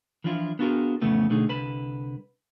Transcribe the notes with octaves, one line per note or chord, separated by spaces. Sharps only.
E3 F3 D4 E4 F4
B3 D4 F4 F#4 G#4 A#4
F2 A2 C#3 E3 A3 B3
B2 D3 A3 D#4 G#4
C2 D3 B4 A5 B5